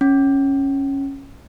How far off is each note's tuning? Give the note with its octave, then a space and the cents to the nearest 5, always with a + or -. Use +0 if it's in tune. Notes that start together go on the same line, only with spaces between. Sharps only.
C#4 -10